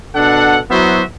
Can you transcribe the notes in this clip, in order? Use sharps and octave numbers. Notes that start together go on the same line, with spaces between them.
B2 D4 A4 F#5
F#3 B3 E4 F#4 C5 E5